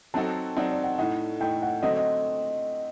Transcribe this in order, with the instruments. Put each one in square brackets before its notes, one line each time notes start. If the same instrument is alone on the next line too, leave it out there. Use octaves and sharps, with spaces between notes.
[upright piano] F#3 C4 D#4 F#4 A4 [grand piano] A5
[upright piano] F#3 C4 D#4 F#4 A4 [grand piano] D5
[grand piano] D5
F#5
[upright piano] A2 A3 D#4 [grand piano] F#5
[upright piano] A2 A3 D#4 [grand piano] G5
[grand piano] F#5
[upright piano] D3 F#3 A3 C4 F#4 [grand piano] D#5
[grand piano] D#5